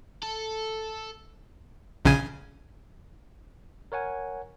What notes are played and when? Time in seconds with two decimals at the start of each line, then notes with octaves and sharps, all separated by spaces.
0.23 A4
2.05 A#1 C#3 G#5
3.92 A#4 C#5 F#5 G#5